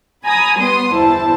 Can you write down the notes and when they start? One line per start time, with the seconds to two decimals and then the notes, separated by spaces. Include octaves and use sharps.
0.24 G#5 A#5 B5 D#6
0.56 G3 B3 C6 D#6
0.93 G1 E2 E4 C5 A5